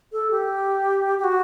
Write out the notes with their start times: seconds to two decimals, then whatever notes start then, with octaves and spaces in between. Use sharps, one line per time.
0.12 A4
0.31 G4
1.19 G4
1.24 F#4